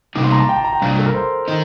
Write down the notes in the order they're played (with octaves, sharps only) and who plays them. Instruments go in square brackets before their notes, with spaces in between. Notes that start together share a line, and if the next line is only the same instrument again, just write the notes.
[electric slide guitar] C3 G3 A#3 D#4 [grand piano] D6
[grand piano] C6
A#5
A5
G5
A5
A#5
G5
[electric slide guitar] C3 G3 D4 [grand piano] F5
[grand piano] A4
A#4
C5
[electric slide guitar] D#3 D#4